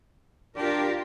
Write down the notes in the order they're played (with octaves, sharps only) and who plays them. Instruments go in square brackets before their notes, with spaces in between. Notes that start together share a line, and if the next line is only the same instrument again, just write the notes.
[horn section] D4 [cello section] F4 G4 A#4